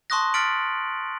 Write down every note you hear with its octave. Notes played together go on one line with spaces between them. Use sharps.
A5 C6 C#6 D#6 F#6 A#6
F6 A6 B6 C#7 D7 F#7